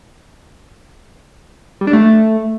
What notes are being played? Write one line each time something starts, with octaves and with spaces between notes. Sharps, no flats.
G3
D4
A3